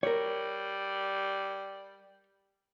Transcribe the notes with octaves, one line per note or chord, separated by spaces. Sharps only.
G3 A#4 C#5